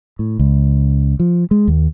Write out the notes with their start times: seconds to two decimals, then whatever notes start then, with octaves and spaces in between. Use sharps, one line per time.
0.19 A2
0.39 C#2
1.20 F3
1.51 G#3
1.68 D#2